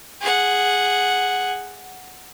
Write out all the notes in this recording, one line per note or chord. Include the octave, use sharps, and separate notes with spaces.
G#4 F#5